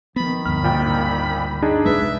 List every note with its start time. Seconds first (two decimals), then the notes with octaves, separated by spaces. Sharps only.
0.16 D#3 F3 B3 B5
0.46 D2 G2 D3 B5 F6
0.63 G#1 A#2 G5
1.62 D4 D#4 G#4
1.85 C2 F2 G#3 B4 E5